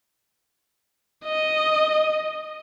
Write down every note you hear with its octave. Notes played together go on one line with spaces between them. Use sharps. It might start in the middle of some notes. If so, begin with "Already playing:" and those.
D#5